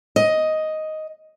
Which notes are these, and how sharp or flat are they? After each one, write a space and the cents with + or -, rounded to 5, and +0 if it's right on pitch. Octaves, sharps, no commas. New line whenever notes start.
D#5 +5